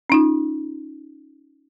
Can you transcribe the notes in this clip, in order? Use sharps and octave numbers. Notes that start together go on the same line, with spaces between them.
C#4 D#4 F4